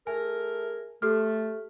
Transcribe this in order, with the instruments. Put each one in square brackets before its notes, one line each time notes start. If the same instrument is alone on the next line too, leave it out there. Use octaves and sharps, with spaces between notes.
[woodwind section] A3 G#4 A#4 [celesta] G#5
[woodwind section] A3 [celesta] G4 A4 F6